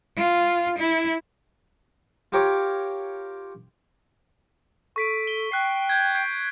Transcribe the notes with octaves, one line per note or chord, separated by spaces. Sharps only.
F4
E4
F4 G4 A#4 C#5 C#6 D6
A4 C#6 B6 D7
G7
G5 F#6 C7
G6 G#6
G6 C7 D7